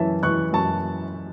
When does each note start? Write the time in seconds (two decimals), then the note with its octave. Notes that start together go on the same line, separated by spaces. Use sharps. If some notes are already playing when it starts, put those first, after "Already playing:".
Already playing: F#2 E3 C#5 E5 A5
0.23 E3 C#6 F#6
0.53 F#2 A5 C#6